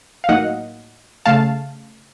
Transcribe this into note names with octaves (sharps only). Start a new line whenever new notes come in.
F5
A2 F#3 A#3 D#4 D#5 F#5
C#3 A3 F5 A5